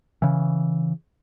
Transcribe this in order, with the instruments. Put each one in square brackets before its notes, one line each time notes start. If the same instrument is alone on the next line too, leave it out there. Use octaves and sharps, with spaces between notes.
[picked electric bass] C#3 E3